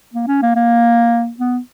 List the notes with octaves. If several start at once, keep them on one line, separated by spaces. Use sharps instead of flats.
A#3
C#4
A#3
A#3
B3